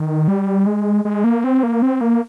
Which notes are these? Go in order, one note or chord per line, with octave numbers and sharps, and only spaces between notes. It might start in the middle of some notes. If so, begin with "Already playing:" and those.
Already playing: D#3
G3
G#3
G#3
A#3
C4
A#3
C4
A#3